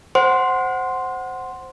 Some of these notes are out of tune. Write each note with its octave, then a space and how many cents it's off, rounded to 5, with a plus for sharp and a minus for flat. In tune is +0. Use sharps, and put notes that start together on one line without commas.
C5 +0 F#5 +5 C6 +0